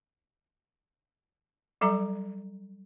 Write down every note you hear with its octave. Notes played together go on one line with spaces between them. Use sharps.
F#3 G3 A4 E5 A#5